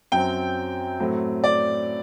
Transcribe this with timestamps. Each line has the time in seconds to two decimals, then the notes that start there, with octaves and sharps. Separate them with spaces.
0.12 F#2 F#3 C4 G5
1.00 A2 F#3 A3 C4
1.44 D5